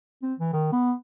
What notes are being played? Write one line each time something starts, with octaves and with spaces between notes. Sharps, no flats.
C4
E3
D#3
B3